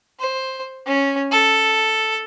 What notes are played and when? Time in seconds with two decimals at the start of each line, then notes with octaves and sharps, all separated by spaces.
0.19 C5
0.86 C#4
1.32 A4